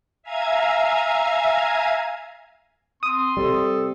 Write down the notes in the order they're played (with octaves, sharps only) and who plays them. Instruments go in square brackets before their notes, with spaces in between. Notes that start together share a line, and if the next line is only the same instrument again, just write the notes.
[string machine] E5 F5 G#5 A#5 G#6
[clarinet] C4 [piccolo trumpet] C6 [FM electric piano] D#6
[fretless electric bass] C3 G3 [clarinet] A4